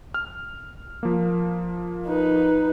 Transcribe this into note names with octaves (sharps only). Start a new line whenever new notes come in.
F6
F3 A#3
D#4 B4